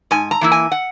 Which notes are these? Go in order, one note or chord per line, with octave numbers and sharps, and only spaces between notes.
G#2 G#5
A#5
E3 A#3 E4
G#5
F#5